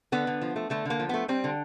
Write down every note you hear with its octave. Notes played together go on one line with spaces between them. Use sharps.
D3 B3
D3
F3
A3
D3 A3
D3 A#3
F3
A3 B3
G3 C4
D3